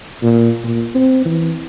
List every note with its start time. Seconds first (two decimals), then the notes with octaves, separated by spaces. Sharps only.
0.22 A#2
0.64 A#2
0.94 C4
1.25 E3